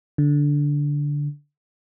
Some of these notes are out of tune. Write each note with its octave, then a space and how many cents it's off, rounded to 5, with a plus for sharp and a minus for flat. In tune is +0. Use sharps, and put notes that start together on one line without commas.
D3 -10